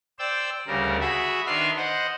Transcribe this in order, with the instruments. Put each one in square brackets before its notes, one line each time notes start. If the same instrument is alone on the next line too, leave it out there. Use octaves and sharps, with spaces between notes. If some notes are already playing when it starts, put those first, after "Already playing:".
[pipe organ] C5 D5 G5 E6
D2 C#3 G3 A#4
F#4 G#4 E5 B5
D#3 D4 B4 E5 C6 F6
C5 D#5 F#5